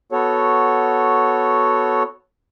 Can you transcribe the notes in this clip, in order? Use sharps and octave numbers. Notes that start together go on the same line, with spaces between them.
B3 F#4 A4 C#5